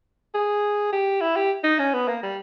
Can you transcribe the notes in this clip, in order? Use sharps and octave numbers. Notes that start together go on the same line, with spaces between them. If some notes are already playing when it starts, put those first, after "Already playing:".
G#4
G4
E4
G4
D#4
C#4
B3
A#3
G3